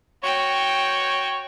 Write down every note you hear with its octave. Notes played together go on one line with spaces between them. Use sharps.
F#4 C#5 G5